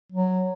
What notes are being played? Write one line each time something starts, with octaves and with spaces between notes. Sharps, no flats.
F#3